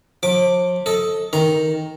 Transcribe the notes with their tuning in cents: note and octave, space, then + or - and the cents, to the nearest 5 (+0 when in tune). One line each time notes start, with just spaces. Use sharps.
F3 +40 D6 +0
A4 +0 D#5 +10
D#3 +10 A#5 +0